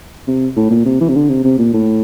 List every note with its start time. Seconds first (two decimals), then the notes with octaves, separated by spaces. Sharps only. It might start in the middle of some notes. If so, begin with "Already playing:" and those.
0.27 C3
0.57 A2
0.71 A#2
0.86 C3
1.01 E3
1.09 C3
1.16 D3
1.29 C3
1.44 C3
1.59 A#2
1.74 A2